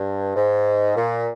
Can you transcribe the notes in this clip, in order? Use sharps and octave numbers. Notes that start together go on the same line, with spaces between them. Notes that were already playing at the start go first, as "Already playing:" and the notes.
Already playing: G2
G#2
A#2